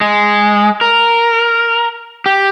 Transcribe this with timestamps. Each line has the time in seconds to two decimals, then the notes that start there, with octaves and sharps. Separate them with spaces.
0.01 G#3
0.81 A#4
2.26 G4